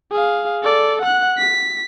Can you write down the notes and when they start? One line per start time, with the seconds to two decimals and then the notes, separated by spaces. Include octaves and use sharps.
0.11 G#4 F5
0.63 A4 D5
1.02 F#5 F#6
1.38 B6